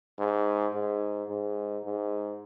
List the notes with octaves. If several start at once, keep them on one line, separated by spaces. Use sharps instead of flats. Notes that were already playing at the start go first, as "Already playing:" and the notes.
G#2
G#2
G#2
G#2